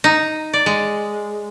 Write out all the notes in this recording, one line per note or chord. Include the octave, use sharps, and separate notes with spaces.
D#4
D5
G#3